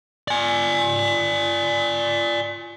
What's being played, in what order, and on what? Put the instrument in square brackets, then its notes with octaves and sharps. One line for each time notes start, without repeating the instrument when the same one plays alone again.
[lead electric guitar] D5 G#5